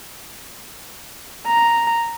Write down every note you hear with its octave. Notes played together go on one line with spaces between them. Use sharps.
A#5